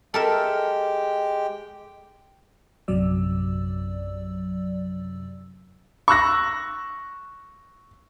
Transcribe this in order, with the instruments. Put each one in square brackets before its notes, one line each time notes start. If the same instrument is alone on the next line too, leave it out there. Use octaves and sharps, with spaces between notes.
[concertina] G#3 G4 G5 [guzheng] A4 A#4 E5
[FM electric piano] A#1 F#2 C3 F#3 D5 E6
[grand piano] C#6 E6 F#6 A#6